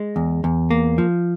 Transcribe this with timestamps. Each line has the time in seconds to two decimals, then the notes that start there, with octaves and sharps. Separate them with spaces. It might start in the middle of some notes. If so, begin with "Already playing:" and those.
Already playing: G#3
0.16 E2
0.44 E2
0.71 A#3
0.98 F3